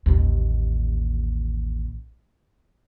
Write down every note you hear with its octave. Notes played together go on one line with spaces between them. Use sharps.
A1 D#2